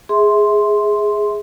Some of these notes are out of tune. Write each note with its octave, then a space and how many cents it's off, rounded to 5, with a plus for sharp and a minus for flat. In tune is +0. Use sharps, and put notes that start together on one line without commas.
G#4 +0 E5 -25 C6 +0